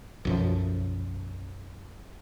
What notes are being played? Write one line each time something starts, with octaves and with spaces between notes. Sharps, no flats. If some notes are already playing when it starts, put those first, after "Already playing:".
B1 F#2 F3